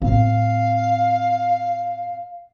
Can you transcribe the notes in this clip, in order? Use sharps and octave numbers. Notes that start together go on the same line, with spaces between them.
A2 C4 F5